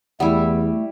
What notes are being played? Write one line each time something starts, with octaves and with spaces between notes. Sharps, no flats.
E2 G3 A3 E4 F#5